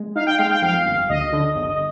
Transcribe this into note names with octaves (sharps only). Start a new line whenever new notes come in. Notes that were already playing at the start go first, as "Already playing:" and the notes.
Already playing: G#3
D#4 F5
G5
G#3 F5
G5
F2 F5
G1
D2 D#5
D3
G1